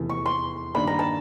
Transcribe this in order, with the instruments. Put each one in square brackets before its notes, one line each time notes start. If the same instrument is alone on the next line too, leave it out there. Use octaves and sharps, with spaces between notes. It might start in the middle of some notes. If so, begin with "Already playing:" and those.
Already playing: [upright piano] F1 E2 C3 E3 A3
[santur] C#6
C6
[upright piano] G2 D#3 G3 A#3 D4 [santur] B5
[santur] A#5
A5